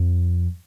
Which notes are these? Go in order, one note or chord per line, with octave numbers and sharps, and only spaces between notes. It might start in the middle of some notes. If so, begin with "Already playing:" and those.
Already playing: F2